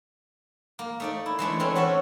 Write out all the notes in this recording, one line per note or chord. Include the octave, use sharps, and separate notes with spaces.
A#3
A3 D#4 D5
E4
E3 G#3 A3 D4
E3 A3 C4 C#4
F#4 A4 C#5 E5